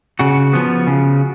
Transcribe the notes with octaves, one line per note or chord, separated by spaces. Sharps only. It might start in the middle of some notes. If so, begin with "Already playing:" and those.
C#3 F#4
F3 B3
C#3